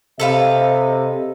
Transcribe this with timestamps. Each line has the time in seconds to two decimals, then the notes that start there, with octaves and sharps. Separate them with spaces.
0.20 C3 A4 B4 D#5 F5